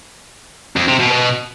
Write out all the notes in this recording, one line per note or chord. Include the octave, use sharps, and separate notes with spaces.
F2
C3
B2
B2